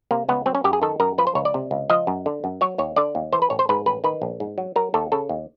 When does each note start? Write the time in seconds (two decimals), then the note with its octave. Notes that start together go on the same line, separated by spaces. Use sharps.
0.11 C3 A#3
0.28 C#2 B3
0.46 F#3 C4
0.55 C#4
0.64 F#2 G4
0.73 G#4
0.82 D#3 A4
1.00 F#2 A#4
1.18 F3 B4
1.27 C5
1.35 C#2 C#5
1.45 D5
1.54 C3
1.71 C#2
1.90 F3 D#5
2.07 F#2
2.26 D3
2.44 F#2
2.61 F#3 C#5
2.78 D#2 C#5
2.96 D3 D5
3.15 D#2
3.33 E3 C5
3.42 B4
3.50 A1 C#5
3.59 C5
3.69 G#2 B4
3.86 A1 B4
4.04 D#3 B4
4.22 A#1
4.40 G#2
4.58 F#3
4.76 F#3 A#4
4.94 D#2 A4
5.12 C#3 A4
5.29 D#2